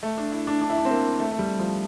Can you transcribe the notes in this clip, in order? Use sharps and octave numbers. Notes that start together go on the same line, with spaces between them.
A3
D4
E4
D4
D4
E4
D4
C4
A#3
A3
A3
G3
F3